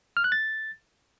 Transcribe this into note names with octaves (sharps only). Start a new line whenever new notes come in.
F6
F#6
A6